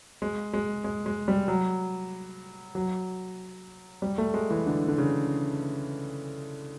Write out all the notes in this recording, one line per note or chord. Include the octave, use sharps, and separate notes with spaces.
G#3
G#3
G#3
G#3
G3
F#3
F#3
G3
A3
G#3
E3
D3
D3
C#3